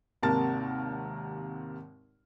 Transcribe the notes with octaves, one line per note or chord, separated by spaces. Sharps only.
G#1 D#2 C3 A#4 A5 A6